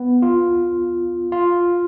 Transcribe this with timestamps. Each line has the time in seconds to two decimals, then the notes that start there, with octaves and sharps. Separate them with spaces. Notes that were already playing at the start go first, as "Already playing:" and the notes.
Already playing: B3
0.22 F4
1.32 F4